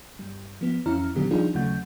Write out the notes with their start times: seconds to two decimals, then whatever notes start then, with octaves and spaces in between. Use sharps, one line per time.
0.19 G2 G3
0.61 F3 B3
0.86 F2 E3 C#4 E4 A#5 F6
1.15 A#2 D3 D#3 F#3 B3 G4
1.31 F3 G3 D4 D#4 F4 G#4
1.54 D#2 C#3 F#3 A3 F#5 G6